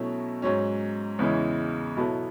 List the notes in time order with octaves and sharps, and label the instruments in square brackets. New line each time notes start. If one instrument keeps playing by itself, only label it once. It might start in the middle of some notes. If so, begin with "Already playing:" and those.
Already playing: [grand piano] B2 F#3 A3 C#4 E4
G#2 F#3 C#4
E2 C#3 E3 G#3 C#4
B2 F#3 B3 E4 A4